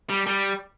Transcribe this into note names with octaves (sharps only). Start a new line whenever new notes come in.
G3
G3